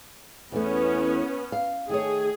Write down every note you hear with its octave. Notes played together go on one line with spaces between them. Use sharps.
E2 E3 A3 B3 C#4
F5
D#3 A3 G#4 C#5